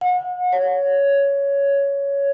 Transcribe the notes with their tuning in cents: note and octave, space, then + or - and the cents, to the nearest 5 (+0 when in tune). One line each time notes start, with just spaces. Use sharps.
F#5 -35
C#5 +10